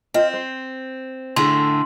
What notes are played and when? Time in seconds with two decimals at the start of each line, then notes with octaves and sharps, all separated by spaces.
0.14 C4 F4 D#5 G5
0.34 C5
1.36 A2 D3 A3 G#4 C6